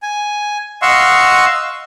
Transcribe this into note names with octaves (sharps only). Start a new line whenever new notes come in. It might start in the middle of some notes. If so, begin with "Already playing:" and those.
G#5
D#5 F5 F#5 C6 C#6 E6